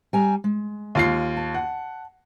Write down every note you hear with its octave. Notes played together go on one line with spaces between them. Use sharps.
G3 G#5 A#5
G#3
D#2 F4 C7
A5
F#5